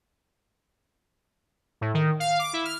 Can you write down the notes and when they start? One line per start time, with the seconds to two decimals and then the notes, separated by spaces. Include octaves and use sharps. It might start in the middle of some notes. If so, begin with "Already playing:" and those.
1.81 A2
1.94 D#3
2.20 F5
2.39 D6
2.53 E4
2.65 F6